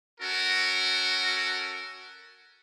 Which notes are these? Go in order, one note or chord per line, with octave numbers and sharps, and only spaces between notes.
C#4 F#4 A4 A#4